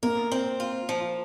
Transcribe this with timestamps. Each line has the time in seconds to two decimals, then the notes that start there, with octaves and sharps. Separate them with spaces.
0.03 A#3 A#4
0.32 C4
0.60 F4
0.89 F3